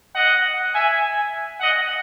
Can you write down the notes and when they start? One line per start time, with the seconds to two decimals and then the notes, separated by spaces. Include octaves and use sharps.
0.15 D#5 F#5
0.74 E5 G#5
1.61 D#5 F#5